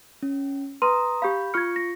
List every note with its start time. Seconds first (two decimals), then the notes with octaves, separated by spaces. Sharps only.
0.23 C#4
0.82 B4 A#5 C6 D#6 D#7
1.22 G4 F5 B5 G6
1.54 F4 C#6 F6 G#6 C#7
1.76 A#6